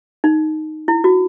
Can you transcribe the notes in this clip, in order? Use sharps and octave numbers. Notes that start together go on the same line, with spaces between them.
D#4
E4
F#4